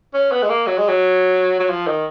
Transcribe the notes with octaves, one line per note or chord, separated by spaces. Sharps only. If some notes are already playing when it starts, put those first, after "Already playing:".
C#4
B3
G#3
A#3
F#3
G#3
F#3
F#3
F3
D#3